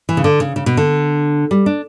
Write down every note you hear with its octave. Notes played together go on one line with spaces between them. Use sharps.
E3
C#3
D3
C#3
C#3
B2
D3
G3
D4